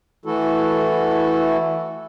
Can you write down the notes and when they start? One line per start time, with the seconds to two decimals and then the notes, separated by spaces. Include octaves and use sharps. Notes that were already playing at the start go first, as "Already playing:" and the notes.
0.25 E3 A3 E4 F#4 A4